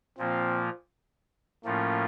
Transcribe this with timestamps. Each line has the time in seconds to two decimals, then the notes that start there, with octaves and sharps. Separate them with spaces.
0.18 A#2 F3 A#3 C4 F4
1.65 A2 F3 A3 A#3 C#4 F4